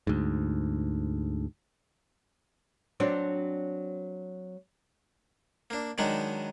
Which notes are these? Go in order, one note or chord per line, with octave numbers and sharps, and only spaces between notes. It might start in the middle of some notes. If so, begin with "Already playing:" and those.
D2 G#2
F#3 C4 D4
A#3 D4
D#3 F#3 G#3 B3 D4 D#4